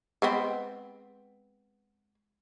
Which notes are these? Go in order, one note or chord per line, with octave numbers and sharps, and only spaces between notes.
G#3 B3 C4